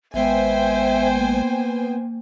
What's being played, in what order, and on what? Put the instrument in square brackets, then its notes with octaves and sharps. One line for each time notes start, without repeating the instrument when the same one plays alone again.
[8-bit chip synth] G#1 G#3 [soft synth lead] B3 [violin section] C5 G5 G#5 [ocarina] E5
[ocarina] A#3